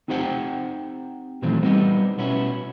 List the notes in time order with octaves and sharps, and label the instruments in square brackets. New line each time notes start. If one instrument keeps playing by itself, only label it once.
[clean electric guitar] C4 D#4 G4 C5 F#5 G5
A#2 D#3 E3 F#3 A3 C4
G3 B3 C4 D#4 G4
B2 B3 C#4 E4